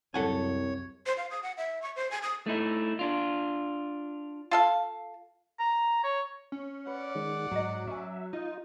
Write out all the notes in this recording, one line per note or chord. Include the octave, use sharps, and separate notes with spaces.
C2 F#2 A4 C#5 F#5 G#5
C5
F5
D#6
F#5
E5
C#6
C5
G#5
D#6
A3 D#4 E4
D4 F4
F4 A4 F5
A#5
C#5
C#4
B4 D5 F#5
D#3 G#3
G#2 F#3 C#5 D#5
C#4 E5 G#5
D#4 F4 D#5